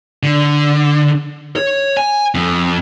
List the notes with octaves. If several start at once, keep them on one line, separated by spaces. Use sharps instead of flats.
D3
C#5
G#5
F2